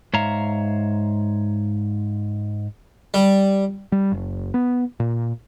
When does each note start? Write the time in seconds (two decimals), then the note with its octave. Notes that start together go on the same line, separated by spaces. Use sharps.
0.14 G#2 C#5 E5 F5 A#5
3.14 G3
3.92 G3
4.12 F#1
4.54 B3
5.00 A#2